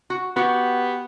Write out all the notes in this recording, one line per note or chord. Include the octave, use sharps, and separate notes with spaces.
F#4
B3 F#4 G4